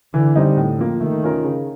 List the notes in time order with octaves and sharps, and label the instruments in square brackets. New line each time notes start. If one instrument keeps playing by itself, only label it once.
[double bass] D3 [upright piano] E3
[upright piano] G3 C4 D#4
A2
F3 A#3
[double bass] D#3 [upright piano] A3
[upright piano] C#4 F4 A#4
C#3